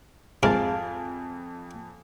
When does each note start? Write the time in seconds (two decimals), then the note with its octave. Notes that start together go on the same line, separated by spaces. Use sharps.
0.43 F2 G#2 A#4 F5 G#5 A5 D6